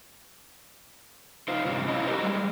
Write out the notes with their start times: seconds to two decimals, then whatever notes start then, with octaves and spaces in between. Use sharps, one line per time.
1.48 D#4 F4 C5
1.65 G2 C3 C#4
1.88 C#4 E4 F4 D#5
2.07 F#4 G4 A#4 C5
2.23 G3 G#3